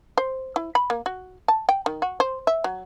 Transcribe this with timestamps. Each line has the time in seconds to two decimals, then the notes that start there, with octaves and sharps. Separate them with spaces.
0.18 C5
0.56 E4
0.75 B5
0.90 A#3
1.06 F#4
1.48 A5
1.69 G5
1.86 D#3
2.02 F#4
2.20 C5
2.47 E5
2.64 F#3